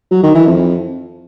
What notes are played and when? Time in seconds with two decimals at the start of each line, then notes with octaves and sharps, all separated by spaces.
0.11 F#3
0.23 D#3
0.35 E3
0.47 F2